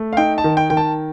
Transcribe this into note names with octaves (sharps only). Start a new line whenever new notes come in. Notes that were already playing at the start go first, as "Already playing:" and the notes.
Already playing: A3
F5
D#4 G5
A5
D#3
G5
D#3 G5
A5